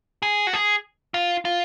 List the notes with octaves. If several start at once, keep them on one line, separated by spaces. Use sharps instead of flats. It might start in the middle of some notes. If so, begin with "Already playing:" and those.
G#4
F#4
G#4
F4
F4